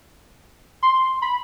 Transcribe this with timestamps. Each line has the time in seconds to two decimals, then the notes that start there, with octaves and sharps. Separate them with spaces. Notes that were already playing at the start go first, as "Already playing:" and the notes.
0.83 C6
1.22 B5